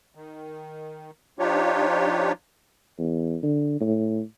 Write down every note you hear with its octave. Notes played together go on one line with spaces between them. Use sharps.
D#3
F3 D4 D#4 F4 G4 C#5
E2
D3
A2